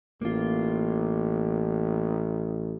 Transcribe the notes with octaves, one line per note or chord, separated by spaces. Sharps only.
A1 A#3 F4